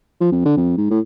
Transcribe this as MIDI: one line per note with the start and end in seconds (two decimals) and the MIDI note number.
0.21 0.30 53
0.32 0.42 41
0.45 0.54 50
0.57 0.73 41
0.77 0.87 44
0.90 0.99 45